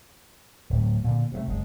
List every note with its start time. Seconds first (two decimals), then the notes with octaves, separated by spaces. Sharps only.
0.70 D1 A2
1.04 A#2 D3
1.32 C3 E3 A3
1.47 F#1 G#3